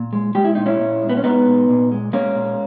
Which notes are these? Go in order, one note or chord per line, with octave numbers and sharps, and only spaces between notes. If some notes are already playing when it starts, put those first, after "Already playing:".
Already playing: A#2
G#3
G#3 G4
E4
A#2 D#4
C#4 E4
A#2
G#3
B3
C#4
G#3 B3 D#4
A#2
A#2
G#3
G#3 A#3 C#4
A#2